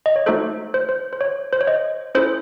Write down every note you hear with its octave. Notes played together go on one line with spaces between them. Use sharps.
D#5
C#5
A3 D#4 F#4 A4 C5
C5
C5
C5
C#5
C5
C#5
C5 D#5
C#4 E4 A4 C5